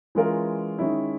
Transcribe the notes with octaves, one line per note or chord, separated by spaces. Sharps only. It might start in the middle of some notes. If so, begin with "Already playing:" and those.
E3 G#3 C#4 F4 A#4
D#3 G#3 C#4 E4